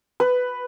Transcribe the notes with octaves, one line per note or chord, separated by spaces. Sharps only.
B4